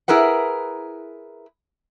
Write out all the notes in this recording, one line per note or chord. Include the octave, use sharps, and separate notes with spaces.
E4 G#4 A#4 B4 F#5